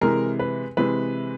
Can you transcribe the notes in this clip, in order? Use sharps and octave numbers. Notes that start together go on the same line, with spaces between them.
C3 E3 G#3 A#4
B4
C3 E3 G#3 B4